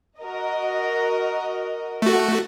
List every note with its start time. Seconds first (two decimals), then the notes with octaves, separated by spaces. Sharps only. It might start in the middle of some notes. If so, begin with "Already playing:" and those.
0.20 F#4 A#4 D#5
2.02 A3 F#4